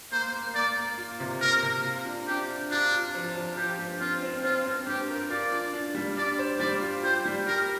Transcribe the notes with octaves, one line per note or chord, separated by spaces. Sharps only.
A#3 C5
A#3
A#3 D5
A#3
F4
C3
A#3 A#4
C3
F4
D4
D4 G4
D4
D4 F4
F4
F3
F3
F3 G4
G2
C4 F4
C4
C4 F4
C4
G2 G4
A#4
F4 D5
D4
D4
G3
D4 D5
C5
G3 D5
F4
G4 C5
G3
G4 A#4